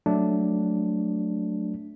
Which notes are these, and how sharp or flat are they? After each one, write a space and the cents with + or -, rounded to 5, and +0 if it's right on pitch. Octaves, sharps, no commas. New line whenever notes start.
F#3 +0 A3 +0 D4 +0